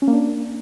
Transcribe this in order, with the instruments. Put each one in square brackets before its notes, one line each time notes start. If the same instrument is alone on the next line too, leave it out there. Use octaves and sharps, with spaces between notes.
[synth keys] C#4
A#3
D4